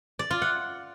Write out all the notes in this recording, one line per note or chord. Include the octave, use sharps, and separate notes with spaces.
D5
F4
F#5